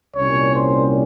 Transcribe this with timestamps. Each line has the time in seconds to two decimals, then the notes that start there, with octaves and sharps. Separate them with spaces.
0.16 C2 A#2 G3 C#4 C#5
0.53 C5